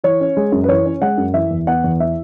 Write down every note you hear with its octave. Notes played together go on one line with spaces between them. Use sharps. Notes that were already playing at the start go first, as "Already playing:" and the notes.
E3 C#5
C#4
G#3
F#2
B4
E3 C#5
C#4
G#3 F#5
F#2
E3 E5
E2
B3 F#5
E2
E3 E5